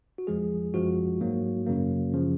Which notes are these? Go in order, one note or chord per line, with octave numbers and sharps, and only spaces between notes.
F#4
F2 F3 G#3 G#4
F#2 F3 G#3 F#4
G#2 F#3 A#3
F#2 C#3 F#3 A#3
F#2 C#3 F3